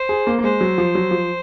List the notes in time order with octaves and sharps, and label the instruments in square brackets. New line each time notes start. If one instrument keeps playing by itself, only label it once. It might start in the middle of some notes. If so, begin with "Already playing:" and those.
Already playing: [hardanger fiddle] C5
[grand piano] G#4
A#3
A#3
[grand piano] G#3 [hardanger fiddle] C5
[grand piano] F#3
F3
F#3
F3